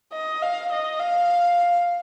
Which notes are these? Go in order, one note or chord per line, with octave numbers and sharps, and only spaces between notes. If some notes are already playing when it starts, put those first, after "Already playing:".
D#5
F5
D#5
F5